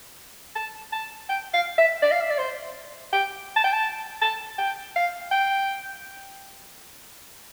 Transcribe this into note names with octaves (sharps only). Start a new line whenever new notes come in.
A5
A5
G5
F5
E5
D5
F5
E5
D5
C5
G5
A5
G5
A5
A5
G5
F5
G5